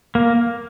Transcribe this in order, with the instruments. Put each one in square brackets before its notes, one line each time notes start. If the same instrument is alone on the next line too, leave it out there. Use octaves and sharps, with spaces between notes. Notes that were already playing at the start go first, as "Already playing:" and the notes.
[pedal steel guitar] A#3